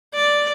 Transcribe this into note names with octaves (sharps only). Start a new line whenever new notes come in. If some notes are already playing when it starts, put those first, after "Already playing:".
D5